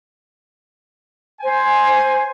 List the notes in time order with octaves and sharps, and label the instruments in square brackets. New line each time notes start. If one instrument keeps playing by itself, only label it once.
[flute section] C5 [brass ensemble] G#5